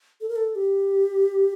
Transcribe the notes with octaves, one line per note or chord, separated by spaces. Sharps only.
A4
A#4
A4
G4